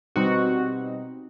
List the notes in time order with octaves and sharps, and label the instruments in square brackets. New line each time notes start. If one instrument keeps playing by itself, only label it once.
[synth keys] B2 G3 C4 D#4 F#4